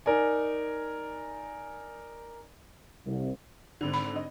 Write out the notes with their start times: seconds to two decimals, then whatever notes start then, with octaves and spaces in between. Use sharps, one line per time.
0.06 D#4 A#4 D5 G#5
3.06 C2
3.81 G#1 D3
3.94 B5
4.16 D#5